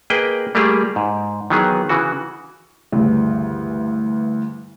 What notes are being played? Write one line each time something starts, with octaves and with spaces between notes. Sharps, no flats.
A#3 G#4 B4 D#5 G5
G3 A3 A#3 G4 G#4
G#2
D#3 E3 F#3 B3 G#4
C#3 E3 F#4
D2 G2 C#3 E3